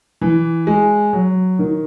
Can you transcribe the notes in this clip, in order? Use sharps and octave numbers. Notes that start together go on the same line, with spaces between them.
E3
G#3
F#3
D#3